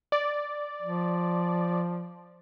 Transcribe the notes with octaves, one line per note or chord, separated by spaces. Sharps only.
D5
F3